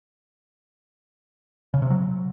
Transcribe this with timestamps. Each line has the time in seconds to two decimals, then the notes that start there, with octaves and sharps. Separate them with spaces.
1.74 C#3
1.82 C3
1.90 F#3